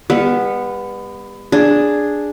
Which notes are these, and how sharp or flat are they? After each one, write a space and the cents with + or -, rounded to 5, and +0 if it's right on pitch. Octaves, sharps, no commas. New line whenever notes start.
G3 +35 B3 -10
D4 +0 G#4 +0